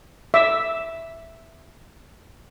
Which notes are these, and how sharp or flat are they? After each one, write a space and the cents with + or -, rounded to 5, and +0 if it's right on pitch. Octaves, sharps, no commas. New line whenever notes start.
E5 +0 D6 +0